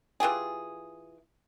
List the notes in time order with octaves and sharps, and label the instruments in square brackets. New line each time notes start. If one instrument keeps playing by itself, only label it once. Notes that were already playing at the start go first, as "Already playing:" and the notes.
[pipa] E3 F4 G4 G#4